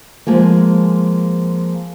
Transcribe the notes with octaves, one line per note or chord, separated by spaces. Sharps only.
F3 G#3 A#3